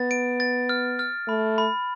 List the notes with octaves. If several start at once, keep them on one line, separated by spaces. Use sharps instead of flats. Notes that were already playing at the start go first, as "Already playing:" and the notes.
Already playing: B3 A6
D7
A6
F6
F6
A3 B5
B5